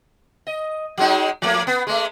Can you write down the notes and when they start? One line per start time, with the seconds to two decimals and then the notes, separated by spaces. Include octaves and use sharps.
0.47 D#5
0.98 F#3 G#3 D#4
1.42 F3 A3 A#3
1.67 B3
1.87 G#3 A3